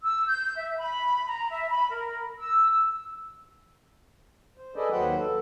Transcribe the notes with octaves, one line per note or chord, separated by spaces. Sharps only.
E6
G6
E5
B5
A#5
E5
B5
A#4
E6
C5
G#4 A4 B4 D5 D#5
D#2 F#3 B4 C5 F#5 G5
A4